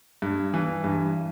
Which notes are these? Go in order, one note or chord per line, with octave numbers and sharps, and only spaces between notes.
G2
E3
G2